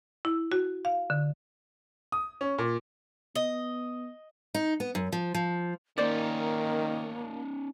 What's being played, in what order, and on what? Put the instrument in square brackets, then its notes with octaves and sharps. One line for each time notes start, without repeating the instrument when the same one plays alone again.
[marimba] E4
F#4
F5
D3
[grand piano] D#6
C#4
A#2
[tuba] B3 [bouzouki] D#5
[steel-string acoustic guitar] D#4
B3
F#2
F3
F3
[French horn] D#3 [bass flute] A#3 [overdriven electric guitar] C#4 D#4 [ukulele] C5 D5